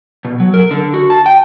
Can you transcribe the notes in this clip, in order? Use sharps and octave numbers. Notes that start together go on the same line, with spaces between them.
B2
F#3
A#4
D3
F#4
A5
G5